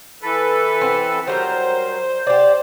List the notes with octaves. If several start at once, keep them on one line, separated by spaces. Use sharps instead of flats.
E3 A4 B4
C4
F#3 G3 A#4 C5
G4 C5 D5